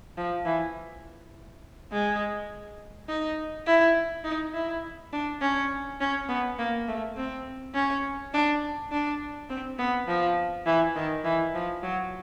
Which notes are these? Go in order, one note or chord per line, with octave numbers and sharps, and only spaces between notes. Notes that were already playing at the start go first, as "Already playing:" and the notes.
F3
E3
G#3
D#4
E4
D#4
E4
D4
C#4
C#4
B3
A#3
A3
C4
C#4
D4
D4
C4
B3
F3
E3
D#3
E3
F3
F#3